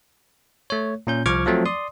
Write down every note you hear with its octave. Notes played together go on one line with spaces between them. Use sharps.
A3 C#5
A#2 C#4 G6
C2 F3 C#6 D6 F6 G#6
F3 F#3 A3 C4
D5 C6 D#6